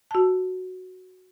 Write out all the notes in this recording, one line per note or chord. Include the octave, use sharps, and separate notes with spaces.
F#4 A5